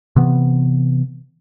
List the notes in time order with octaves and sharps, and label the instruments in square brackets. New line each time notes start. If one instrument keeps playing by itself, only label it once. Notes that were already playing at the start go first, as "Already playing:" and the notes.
[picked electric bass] C3 E3 B3